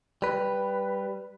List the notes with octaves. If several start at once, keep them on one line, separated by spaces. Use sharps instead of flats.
G3 B4